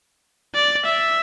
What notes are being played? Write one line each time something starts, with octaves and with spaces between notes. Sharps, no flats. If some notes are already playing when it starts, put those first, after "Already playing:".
D5
E5